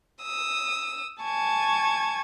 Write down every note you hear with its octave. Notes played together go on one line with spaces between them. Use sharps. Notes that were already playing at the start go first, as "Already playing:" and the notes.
D#6 E6
G#5 A5 C#6 G#6